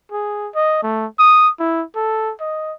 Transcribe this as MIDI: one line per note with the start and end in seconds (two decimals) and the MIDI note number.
0.12 0.49 68
0.55 0.79 75
0.83 1.06 57
1.19 1.49 87
1.60 1.83 64
1.95 2.32 69
2.40 2.73 75